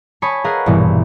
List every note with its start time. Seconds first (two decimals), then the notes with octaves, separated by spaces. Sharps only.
0.22 C#5 G#5 A5 B5 C#6 D#6
0.44 G#4 A#4 B4 D#5 F5 F#5
0.66 A#1 G2 B2 E3